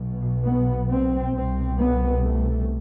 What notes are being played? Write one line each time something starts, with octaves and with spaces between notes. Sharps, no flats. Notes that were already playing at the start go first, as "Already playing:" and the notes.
Already playing: B1 B2
B3
C4
C2 B2 C4
B3
A3